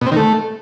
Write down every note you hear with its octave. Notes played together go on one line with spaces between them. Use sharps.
B2
C4
D#3
A3